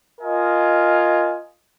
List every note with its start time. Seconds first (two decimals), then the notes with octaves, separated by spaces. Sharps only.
0.21 F4 A#4 D#5 G#5